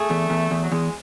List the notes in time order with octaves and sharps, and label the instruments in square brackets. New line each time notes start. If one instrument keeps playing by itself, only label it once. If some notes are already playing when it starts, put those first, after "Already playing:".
Already playing: [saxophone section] A3 [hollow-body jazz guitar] G#4
[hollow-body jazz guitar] E2
E2
E2
[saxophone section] F#3
[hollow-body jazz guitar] E2 [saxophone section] G#3